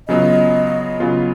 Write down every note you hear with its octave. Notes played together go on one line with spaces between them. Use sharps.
C#3 F#3 B3 F4 D#5
C#3 F#3 B3 F4